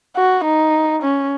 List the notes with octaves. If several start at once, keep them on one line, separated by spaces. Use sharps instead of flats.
F#4
D#4
C#4